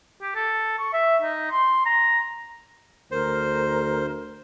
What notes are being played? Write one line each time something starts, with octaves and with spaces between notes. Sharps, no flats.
G4
A4
C#6
E5
D#4
C6
A#5
D2 A#4 C5